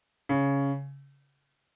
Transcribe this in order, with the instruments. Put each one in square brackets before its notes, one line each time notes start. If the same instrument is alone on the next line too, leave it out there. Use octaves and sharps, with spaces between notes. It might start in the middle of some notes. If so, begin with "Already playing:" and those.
[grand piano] C#3